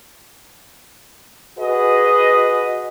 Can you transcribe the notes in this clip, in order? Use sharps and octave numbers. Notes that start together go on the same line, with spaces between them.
F#4 G#4 B4 D#5